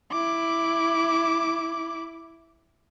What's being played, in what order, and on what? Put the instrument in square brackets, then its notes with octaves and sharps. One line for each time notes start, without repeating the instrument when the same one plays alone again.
[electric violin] E4 D6